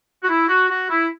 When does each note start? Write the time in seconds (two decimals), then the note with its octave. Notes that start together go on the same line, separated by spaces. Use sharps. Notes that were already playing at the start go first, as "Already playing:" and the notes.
0.23 F#4
0.29 E4
0.48 F#4
0.69 F#4
0.89 E4